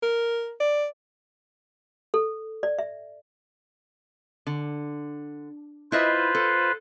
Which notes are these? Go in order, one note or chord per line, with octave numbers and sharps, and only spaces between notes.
A#4
D5
A4
D5
E5
D3
E4 F4 B4 C5 D#5 E5
A4